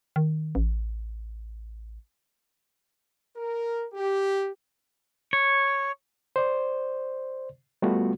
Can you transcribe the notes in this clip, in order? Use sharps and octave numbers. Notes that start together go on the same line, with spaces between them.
D#3
A1
A#4
G4
C#5
C5 D5
G3 A3 B3 F4 F#4